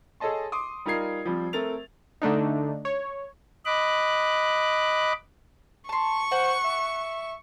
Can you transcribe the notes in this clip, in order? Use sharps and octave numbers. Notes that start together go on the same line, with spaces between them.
G#4 A4 C#5 D#5 A5 C6
C6 D6 D#6
G3 D#4 F4 A#4 G#6 C7
F3 G3 C4
A3 C4 A#4 A6 F7
D3 A3 D4 D#4
C#5
D#5 B5 D6 F#6
A5 C6 C#6
C5 F#5
E5